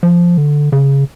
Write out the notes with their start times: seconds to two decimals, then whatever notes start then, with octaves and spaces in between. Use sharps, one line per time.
0.03 F3
0.37 D3
0.72 C#3